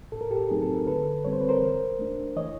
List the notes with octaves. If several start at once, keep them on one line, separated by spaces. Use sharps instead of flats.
A2 A4
A#4
G4 A4
F#3 A3 C4 D#4 G#4
A4
A#4
D3 A4 B4
G3 C4 C#5
C5
B4
A#4 C5
E3
A3 D4
E3 C#5 D#5